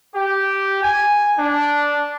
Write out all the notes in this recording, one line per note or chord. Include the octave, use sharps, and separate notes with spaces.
G4
G#5
D4